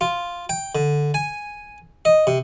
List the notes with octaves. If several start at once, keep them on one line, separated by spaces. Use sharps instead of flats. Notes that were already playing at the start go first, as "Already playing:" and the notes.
F4
G5
D3
G#5
D#5
C3